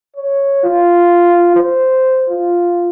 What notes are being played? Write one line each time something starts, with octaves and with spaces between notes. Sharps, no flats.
C#5
F4
C5
F4